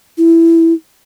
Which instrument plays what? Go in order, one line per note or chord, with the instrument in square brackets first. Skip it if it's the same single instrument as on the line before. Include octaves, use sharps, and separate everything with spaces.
[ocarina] E4